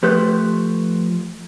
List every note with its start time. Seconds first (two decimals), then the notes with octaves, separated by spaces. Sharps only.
0.03 F3 A3 G4 B4 C5